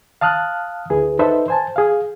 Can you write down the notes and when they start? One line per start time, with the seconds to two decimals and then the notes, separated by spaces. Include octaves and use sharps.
0.21 F5 A5 D#6 F6 F#6
0.90 D2 E4 G#4 B4
1.19 D#4 A4 B4 C5 D#5 E5
1.48 C5 G#5 A5
1.76 G#4 F5